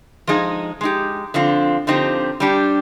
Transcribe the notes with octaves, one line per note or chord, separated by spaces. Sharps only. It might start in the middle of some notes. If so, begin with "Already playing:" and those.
F3 G#3 D#4 G#4
G#3 D#4 G4
D3 F3 C4 F4
D3 F3 C4 D#4 G4
G3 D4 G4